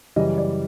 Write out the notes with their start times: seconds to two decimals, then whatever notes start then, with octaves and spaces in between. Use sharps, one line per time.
0.16 F#2 C#3 E3 G3 D#5
0.38 D5